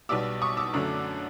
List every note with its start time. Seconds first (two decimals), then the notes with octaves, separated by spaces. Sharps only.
0.09 B1 B2 G3 B3 D6 E6
0.42 C#6 D#6
0.57 D6 E6
0.73 F#2 D3 F#3 A3